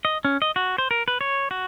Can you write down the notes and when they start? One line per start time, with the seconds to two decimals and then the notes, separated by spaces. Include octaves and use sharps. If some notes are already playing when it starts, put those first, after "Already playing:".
0.05 D#5
0.25 C#4
0.42 D#5
0.56 F#4
0.78 C5
0.91 A#4
1.08 B4
1.21 C#5
1.51 F#4